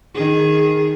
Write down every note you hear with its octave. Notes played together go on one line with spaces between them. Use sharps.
D#3 G#4